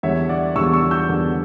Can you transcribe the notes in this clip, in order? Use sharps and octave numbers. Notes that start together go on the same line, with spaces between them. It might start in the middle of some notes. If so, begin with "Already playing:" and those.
E2 D3 G3 C#5 E5
D5 F#5
E2 D3 G3 C#6 E6
C#6 E6
E6 G6
E2 D3 G3